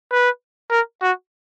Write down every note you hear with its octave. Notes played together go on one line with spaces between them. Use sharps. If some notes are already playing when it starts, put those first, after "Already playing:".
B4
A#4
F#4